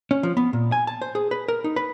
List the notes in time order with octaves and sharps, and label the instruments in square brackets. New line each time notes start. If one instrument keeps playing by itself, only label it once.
[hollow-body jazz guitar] C#4
F3
B3
A#2
G#5
A5
C5
G#4
B4
A#4
D#4
B4